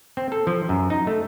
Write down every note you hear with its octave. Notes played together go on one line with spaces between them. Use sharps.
C4
A4
F3
F#2
D#4
A3